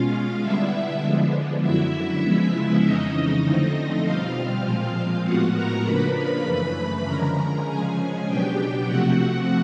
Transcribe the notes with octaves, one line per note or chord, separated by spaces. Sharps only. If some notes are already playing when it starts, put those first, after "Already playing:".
Already playing: B2 G#3 C#4 F4 F5
D3 G3 B3 D4 E4 E5
D3 F3 G#3 B3 D4
F#2 D3 F#3 E4 E5
C#3 F3 G#3 B3
F2 C#3 E3 G#3 C#4 D#4 D#5
D3 F3 A3 C4
B2 G3 C4 F4 F5
A#2 F3 G#3 C4
A2 F3 G#3 B3 F#4 F#5
A#4 A#5
C#3 F3 A#3 D4 B4 B5
F#2 C#3 E3 A3
D3 F3 G#3 C#4 A#4 A#5
C#3 F3 G#3 C#4 G#4 G#5
B2 F#3 B3 D4 G4 G5
C3 F3 A3 C4 F#4 F#5